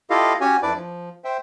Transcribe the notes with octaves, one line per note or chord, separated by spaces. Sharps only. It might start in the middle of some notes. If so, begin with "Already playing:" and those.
E4 F4 G4 A4 D#5 F5
C#4 F#4 G4 C#5 G#5
F2 D4 E4 B4 D5 D6
F3
C5 E5 G5